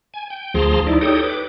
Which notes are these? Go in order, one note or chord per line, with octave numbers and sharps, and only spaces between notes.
G#5
G5
D2 F3 G#4 A5 A#5 C6
D#4 E4 D5
D#4 G4 A4 C#5 G5 D#6
B4 D6